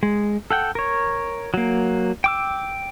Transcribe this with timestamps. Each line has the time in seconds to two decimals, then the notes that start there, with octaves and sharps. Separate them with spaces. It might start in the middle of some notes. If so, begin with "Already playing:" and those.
0.03 G#3
0.51 A4 F#5 G5
0.75 A#4 C#5
1.54 F#3 A#3
2.24 G5 D6 E6